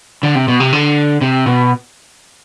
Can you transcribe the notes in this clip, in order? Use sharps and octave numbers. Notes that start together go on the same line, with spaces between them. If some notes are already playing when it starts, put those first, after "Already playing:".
D3
C3
B2
C3
D3
C3
B2